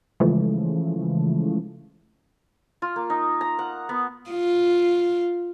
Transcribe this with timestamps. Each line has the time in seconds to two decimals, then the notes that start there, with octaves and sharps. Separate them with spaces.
0.20 C#3 E3 F3 G#3 A3
2.82 F4
2.96 A#3
3.10 D#4
3.41 A#5
3.59 F#5
3.89 B3
4.30 F4